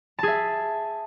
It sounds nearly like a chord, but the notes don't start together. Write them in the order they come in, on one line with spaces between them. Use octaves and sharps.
A5 G#4 E5